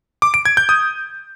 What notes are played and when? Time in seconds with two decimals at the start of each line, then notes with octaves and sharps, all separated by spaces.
0.22 D6
0.34 D7
0.45 G#6
0.57 G6
0.69 D#6